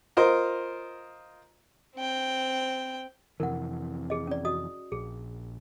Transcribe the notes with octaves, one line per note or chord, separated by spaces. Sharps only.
F4 A#4 C5 D#5
C4 G5
F2 C3 E3 A#4 F#5
G#4 D#5
C#4 D5
F#4 D#5 D#6
A#1 G#4